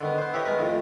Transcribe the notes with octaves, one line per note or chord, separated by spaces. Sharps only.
D3 D#3 B3
B3 C5
E4 G4 B4 C#5 D#5
G#3 B3 A#4 B4
F2 A2 D#3